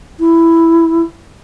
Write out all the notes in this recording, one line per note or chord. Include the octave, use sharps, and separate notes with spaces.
E4